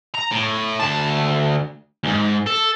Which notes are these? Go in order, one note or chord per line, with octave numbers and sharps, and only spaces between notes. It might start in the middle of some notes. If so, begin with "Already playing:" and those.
A#5
A2
D2 A5
D2 G#2
A4